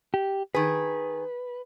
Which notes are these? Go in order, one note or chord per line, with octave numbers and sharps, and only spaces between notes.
G4
D#3 G#4 B4